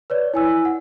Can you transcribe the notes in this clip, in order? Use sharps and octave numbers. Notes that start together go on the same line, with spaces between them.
B4 C#5 D5
E4 G#5 E6
F#5